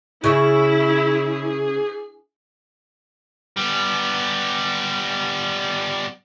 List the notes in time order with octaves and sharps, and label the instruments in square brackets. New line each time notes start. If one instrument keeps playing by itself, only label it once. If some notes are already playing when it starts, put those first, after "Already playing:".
[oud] C#3 [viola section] E4 [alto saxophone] G#4
[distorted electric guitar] G3 B3